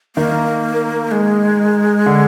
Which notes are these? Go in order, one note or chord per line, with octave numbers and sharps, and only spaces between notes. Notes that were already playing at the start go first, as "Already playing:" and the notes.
D#3 A#3
G#3
D3